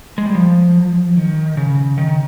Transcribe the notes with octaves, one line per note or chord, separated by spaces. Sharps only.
G#3
G3
F3
D#3
C#3
D#3